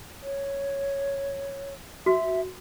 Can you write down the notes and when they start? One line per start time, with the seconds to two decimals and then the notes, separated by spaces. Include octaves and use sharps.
0.23 C#5
2.06 F#4 E5